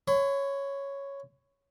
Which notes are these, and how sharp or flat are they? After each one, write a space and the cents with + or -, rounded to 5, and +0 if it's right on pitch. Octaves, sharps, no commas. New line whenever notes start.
C#5 +0 B5 +40